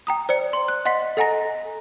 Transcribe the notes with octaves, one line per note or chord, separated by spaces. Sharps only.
G5 A#5 D#6
C5 D5 C#7
C6
F#6
D#5 F#5 C6 B6
A4 D#5 F#5 G#5 A#5 A#6